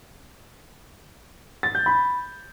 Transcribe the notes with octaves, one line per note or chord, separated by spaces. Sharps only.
A6
G6
B5